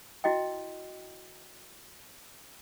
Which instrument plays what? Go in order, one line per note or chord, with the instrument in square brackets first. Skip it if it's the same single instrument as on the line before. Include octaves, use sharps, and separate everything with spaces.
[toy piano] E4 F#4 D#5 G5